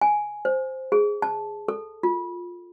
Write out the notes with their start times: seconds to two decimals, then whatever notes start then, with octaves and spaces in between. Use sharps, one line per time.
0.01 G#5
0.45 C5
0.92 G#4
1.22 A5
1.68 A4
2.03 F4